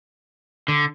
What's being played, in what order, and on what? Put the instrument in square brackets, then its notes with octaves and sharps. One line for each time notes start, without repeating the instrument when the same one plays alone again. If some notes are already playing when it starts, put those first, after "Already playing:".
[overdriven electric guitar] D3